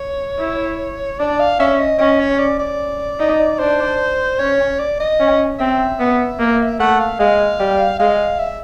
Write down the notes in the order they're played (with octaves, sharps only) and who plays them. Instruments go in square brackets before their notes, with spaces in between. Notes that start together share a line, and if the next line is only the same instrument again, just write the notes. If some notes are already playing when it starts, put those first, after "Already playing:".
Already playing: [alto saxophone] C#5
[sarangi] E4
[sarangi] D4 [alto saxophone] D5
[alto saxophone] F5
[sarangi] C#4 [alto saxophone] E5
[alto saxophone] D#5
[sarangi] C#4 [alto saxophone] D#5
[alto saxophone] C#5
D5
D5
[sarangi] D#4
[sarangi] D4 [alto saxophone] C5
[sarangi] C#4 [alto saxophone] C#5
[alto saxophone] D5
D#5
[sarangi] C#4
[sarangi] C4 [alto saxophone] E5
[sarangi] B3
A#3
[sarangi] A3 [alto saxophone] F#5
[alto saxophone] F5
[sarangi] G#3 [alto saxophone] F5
[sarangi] G3
[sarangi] G#3 [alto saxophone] F5
[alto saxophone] E5